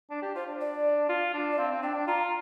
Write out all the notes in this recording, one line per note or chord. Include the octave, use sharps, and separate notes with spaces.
D4
G4
F4 C5
D4
D5
F4
D4
D5
C4 F5
C4
D4 G5
D4
F4 A#5